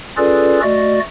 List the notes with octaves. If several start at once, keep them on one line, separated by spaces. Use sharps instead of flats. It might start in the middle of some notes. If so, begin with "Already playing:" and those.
C#4 F4 G#4 A4 B4 D5
A3 F#4 D5 D#5